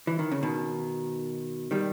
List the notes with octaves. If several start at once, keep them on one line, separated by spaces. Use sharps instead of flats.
E3
D#3
C#3
B2 D#3
D#3 G3